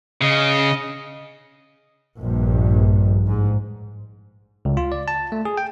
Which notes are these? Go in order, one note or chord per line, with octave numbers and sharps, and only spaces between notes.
C#3 D#5
A#1 G2
G#2
C#2
F4
D5
A5
A3
G#4
G5